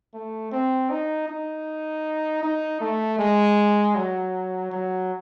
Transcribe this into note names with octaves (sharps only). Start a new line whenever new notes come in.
A3
C4
D#4
D#4
D#4
A3
G#3
F#3
F#3